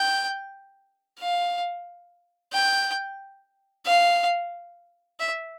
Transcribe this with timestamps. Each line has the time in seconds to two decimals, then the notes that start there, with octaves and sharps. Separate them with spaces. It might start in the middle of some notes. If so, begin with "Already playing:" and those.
Already playing: G5
1.19 F5
2.52 G5
3.85 F5
5.19 E5